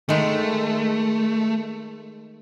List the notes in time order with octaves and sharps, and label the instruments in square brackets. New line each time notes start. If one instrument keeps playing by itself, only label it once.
[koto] D#3 G#3 [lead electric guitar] A3